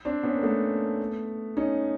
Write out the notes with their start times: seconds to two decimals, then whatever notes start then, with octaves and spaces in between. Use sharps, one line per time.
0.05 C4 D4
0.23 B3 C#4
0.36 A#3
0.43 A3 B3
1.57 C#4 D#4